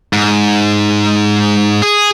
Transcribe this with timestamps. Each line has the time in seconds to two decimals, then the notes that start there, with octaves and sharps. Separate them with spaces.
0.13 G#2
1.82 G#4